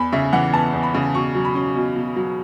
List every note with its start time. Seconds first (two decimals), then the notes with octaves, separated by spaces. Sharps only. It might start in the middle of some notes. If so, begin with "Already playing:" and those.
Already playing: E2 B5
0.12 C#3 E5
0.33 E3 F#5
0.53 B3 A5
0.73 E2
0.83 B5
0.94 C#3
1.14 B2 C#6
1.35 F#3
1.45 B5
1.55 C#4
1.75 B2
1.96 B2
2.16 F#3